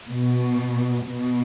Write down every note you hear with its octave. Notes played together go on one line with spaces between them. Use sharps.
B2
B2